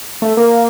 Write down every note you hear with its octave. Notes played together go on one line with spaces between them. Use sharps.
A3
A#3